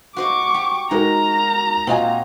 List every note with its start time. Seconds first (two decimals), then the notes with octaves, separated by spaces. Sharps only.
0.16 F#4 C5 D#5 C#6 D6
0.54 G4
0.91 G#3 D#4 F#4 A#4 A#5
1.87 A#2 C4 F4 F#4 D#5 G#5